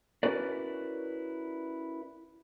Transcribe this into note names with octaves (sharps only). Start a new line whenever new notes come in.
C#4 E4 F#4 A#4 B4 D5